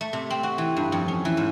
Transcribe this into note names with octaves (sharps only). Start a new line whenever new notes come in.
A3
C3
C4
F#4
E3
G2
F2
C#4
E3
G#2